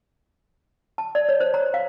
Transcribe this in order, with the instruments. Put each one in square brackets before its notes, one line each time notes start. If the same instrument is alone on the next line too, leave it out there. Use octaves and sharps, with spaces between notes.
[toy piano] A5
D5
C#5
C5
A#5
F5